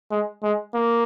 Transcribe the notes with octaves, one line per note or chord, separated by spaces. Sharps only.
G#3
G#3
A#3